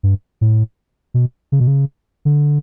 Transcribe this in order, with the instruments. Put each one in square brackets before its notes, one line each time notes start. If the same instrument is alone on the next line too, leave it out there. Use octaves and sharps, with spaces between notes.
[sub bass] G2
A2
B2
C#3
B2
C#3
D3